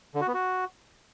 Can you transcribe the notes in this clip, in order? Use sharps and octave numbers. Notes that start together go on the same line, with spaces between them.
D3
F#4
B3
F#4